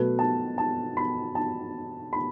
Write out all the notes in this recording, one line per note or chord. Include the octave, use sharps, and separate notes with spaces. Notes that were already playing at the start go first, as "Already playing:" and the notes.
Already playing: B2 F#3 A3 B4
A5
A5
B5
A5
B5